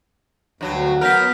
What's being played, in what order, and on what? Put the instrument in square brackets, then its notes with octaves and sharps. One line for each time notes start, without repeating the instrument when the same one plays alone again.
[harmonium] D2 [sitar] G2 F#3
[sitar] F#3 A#4 [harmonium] B3 [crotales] F6 G6 B6